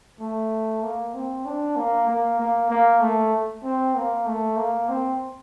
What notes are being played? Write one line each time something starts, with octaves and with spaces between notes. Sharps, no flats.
A3
A#3
C4
D4
A#3
A#3
A#3
A#3
A3
C4
A#3
A3
A#3
C4